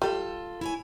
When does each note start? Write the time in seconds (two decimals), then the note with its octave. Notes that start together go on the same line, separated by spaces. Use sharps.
0.02 G3 F4 A4
0.61 E4 C#5 G#5